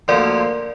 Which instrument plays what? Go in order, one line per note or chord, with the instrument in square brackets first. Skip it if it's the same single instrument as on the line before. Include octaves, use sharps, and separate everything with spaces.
[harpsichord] D2 D3 F3 A#3 F4 [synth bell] D5